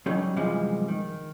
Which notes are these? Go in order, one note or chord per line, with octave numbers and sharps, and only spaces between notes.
F#3 G3 C#4 D#4
F#2 C3 E3 F3 G3 G#3
D#3